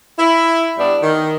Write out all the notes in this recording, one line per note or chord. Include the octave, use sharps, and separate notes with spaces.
E4
G2 G3 B3 D4
D#3